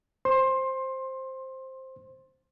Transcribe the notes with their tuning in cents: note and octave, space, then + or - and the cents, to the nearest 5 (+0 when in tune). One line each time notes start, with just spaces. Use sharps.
C5 +5 C6 +20